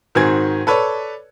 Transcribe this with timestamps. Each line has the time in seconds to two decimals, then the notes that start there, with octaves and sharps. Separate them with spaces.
0.15 G#2 D#3 C4 F#4 G#5 G#6
0.67 A4 B4 C#5 D5